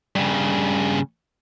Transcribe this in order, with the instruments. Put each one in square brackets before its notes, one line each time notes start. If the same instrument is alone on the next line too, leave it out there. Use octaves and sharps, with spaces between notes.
[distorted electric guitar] G2 C#3